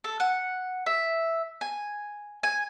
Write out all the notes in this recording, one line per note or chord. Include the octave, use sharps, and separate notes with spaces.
A4
F#5
E5
G#5
G#5